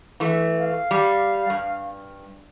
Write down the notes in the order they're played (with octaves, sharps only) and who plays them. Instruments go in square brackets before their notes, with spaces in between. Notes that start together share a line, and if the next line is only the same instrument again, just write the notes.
[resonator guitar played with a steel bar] E3 A3
[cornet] F5
[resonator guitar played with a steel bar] G3
G2